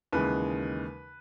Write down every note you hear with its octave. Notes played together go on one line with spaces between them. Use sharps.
D#2 C#3 E3 G#3 B4